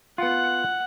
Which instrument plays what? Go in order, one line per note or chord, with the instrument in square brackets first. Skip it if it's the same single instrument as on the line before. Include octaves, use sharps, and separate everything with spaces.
[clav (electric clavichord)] B3 F4 [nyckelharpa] F#5